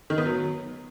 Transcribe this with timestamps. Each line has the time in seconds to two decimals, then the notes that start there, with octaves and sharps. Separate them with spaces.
0.10 D#3
0.18 B3
0.26 F#3